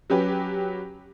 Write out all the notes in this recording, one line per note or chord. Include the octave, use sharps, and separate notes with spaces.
F#3 C#4 G4 B4